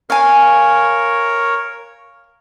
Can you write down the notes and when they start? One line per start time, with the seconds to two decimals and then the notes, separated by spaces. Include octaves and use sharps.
0.10 A#4 C#5 F5 G#5